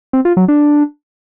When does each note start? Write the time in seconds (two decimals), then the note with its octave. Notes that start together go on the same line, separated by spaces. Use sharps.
0.13 C4
0.25 F4
0.37 F#3
0.48 D4